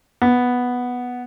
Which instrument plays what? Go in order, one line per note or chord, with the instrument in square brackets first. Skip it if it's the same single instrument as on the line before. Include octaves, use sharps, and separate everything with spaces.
[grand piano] B3